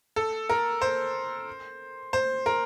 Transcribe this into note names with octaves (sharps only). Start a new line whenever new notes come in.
A4
A#4
C5
C5
A#4